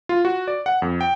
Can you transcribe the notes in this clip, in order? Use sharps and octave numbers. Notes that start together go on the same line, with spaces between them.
F4
F#4
D5
F#5
F2
G5